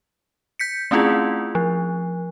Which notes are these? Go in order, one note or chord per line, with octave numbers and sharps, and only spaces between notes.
G6 B6 C#7
A3 C4 C#4 E4 F4 G#4
F3